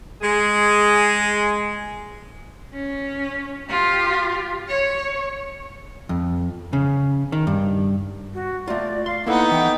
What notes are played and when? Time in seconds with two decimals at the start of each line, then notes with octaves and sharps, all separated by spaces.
0.22 G#3 G#4
2.73 C#4
3.69 F4 G4
4.69 C#5
6.09 F2
6.73 C#3
7.32 D#3
7.47 G2
8.34 F#4
8.68 A3 F4 D5
9.06 F5 C6
9.27 A#3 B3 D#4 E4 A4 F#5
9.51 E3 G5